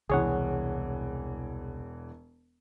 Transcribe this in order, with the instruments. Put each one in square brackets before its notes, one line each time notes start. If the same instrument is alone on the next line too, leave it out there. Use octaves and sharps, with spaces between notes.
[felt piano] E1 E3 [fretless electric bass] C2 [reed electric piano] G#4 C#5 F#5